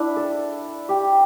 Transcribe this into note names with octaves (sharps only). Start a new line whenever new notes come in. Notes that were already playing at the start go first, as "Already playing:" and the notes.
Already playing: D4 E4
A4
G4